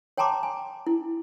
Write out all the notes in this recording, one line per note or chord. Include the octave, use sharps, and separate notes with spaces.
C#5 G5 A5 A#5 C6 D6
G#5
E4